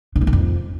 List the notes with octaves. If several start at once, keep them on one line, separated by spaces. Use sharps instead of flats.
D3
F3
D#3
F2